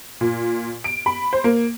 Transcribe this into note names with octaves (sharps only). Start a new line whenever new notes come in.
A#2
D7
B5
C5
A#3